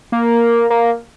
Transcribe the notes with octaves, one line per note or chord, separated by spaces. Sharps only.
A#3
A#3